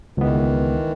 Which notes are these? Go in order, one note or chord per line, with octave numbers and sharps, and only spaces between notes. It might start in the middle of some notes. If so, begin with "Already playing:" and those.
C#2 D#3 E3 B3